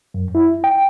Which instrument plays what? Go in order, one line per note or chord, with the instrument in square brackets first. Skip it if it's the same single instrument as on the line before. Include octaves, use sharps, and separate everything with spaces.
[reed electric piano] F#2
E4
G5